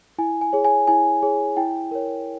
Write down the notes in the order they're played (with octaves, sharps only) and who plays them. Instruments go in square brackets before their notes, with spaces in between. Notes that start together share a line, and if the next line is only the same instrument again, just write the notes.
[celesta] E4 G#5
G#5
G#4 C#5
G#5
E4 G#5
G#4 C#5
E4 G5
A#4 C#5